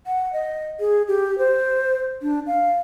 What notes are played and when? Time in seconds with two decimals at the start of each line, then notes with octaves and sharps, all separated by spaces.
0.07 F#5
0.33 D#5
0.80 G#4
1.08 G4
1.38 C5
2.22 D4
2.47 F5